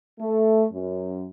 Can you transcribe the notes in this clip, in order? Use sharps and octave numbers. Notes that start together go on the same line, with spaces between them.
A3
F#2